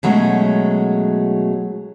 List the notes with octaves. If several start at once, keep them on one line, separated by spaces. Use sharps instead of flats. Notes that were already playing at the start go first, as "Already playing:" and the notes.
B2 F#3 G#3 A3 C#4